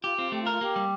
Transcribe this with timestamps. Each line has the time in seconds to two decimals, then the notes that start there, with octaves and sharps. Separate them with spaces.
0.04 F4 G4
0.18 C4 F4
0.32 A3 G4
0.42 F4
0.47 A#4
0.52 F4
0.61 A#3 G4
0.76 G3